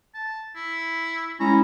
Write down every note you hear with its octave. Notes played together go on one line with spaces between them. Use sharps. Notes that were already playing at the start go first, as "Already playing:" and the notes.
A5
E4
G#3 C#4 E4 A#5